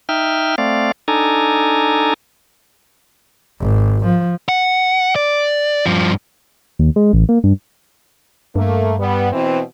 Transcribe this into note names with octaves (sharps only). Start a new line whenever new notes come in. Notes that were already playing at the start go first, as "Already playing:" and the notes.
D#4 E5 G5 F6
A3 C4 D5 F5
D4 D#4 A4 G#5 A#5
G#1
F3
F#5
D5
G2 F3
D#2
G#3
A1
A#3
G2
G2 A3 A#3
G3 B3
B2 E3 C4